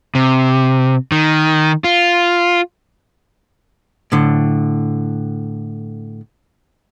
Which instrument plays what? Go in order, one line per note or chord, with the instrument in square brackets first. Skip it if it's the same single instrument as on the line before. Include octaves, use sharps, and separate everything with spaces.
[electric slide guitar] C3
D#3
F4
[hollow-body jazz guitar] A2 D3